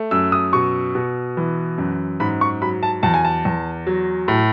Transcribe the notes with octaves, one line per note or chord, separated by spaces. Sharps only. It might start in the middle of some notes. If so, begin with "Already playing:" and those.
Already playing: A3
F#2 E6
D#6
B2 C#6
B2
E3
F#2
G#2 B5
C#6
F#3 B5
A5
E2 A5
G#5
A5
E2
F#3
A2